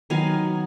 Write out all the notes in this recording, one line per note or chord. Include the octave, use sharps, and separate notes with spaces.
D#3 F#3 B3 F5 G#5